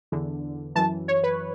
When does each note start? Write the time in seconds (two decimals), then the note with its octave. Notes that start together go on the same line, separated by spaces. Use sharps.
0.12 E2 D3
0.75 F#2 E3 A5
1.08 C#5
1.24 B4